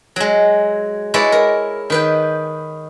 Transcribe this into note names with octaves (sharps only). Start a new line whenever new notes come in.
F#3 G#3
G#3 E4 B4 C#5 D5
A#4
D#3 B4 G5